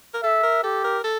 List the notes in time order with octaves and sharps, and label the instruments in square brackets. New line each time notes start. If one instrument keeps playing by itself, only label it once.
[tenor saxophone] A#4
[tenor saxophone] A4 [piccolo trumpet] E5
[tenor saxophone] A#4
[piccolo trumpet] G4 [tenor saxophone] A4
[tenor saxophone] A#4
A4